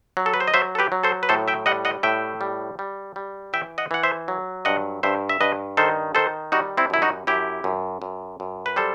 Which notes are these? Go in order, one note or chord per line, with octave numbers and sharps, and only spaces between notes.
F#3
A4
B4
C5
D#5
F#3 C5 E5
A4
G4 B4
F#3
A4 C5
B4
A2 A4 C5
E5 G5
G3 D#5 F#5
D#5 F#5
A2 E5 G5
G3
G3
G3
E3 E5 G5
D#5 F#5
E3 F#5
C5 E5
F#3
G2 D#5 F#5
G2 C5 E5
E5
G2 B4 D#5
D#3 A4 C5
D#3 A4 C5
G3 D#4 F#4
C4 E4
F#2 E4
D#4 F#4
F#2 E4 G4
F#2
F#2
F#2
B4
G3 A4 C5